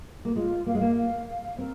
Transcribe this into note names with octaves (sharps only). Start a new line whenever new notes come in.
A#3
G#3 F4
A#3 F5
G#3
A#3
F5
F5
C4 A#4